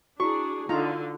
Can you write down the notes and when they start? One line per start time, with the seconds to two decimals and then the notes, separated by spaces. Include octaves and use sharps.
0.20 D4 E4 F#4 G#4 C#6
0.69 D3 D#4 F4 A#5